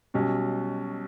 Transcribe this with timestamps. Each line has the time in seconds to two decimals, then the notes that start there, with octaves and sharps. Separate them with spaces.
0.14 B1 B2 G3 C#4